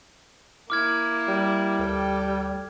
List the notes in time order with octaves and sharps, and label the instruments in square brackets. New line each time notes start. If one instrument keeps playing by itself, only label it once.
[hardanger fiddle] A#3 E4 [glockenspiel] D6 F6 G#6
[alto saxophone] G3
[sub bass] D2 [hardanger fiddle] A4 G5